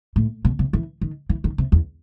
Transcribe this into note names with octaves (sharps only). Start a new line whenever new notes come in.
A2
B2
C3
E3
D#3
E3
D#3
C3
E2